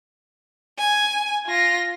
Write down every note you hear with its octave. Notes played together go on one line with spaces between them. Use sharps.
G#5
F4 A#6